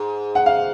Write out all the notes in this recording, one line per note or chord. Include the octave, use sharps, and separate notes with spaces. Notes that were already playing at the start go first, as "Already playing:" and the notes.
Already playing: G#2
F#5
F5